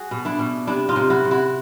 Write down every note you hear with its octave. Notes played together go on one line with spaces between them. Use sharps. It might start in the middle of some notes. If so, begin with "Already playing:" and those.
Already playing: F#4 G#4
B2
D4 E4
B2
C3 D4 E4
D#4 F4
C3
E4 F#4
C3
E4 F#4